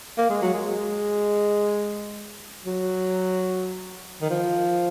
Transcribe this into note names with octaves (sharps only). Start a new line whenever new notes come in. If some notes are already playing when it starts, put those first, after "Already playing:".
A#3
G#3
F#3
G#3
F#3
D#3
F3